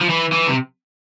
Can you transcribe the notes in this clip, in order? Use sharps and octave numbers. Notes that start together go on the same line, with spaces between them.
F3
E3
E3
C3